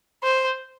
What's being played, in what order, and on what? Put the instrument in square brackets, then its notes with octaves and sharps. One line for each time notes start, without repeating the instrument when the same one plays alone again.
[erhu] C5